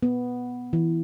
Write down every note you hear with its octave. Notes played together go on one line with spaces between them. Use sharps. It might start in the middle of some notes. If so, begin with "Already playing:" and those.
B3
E3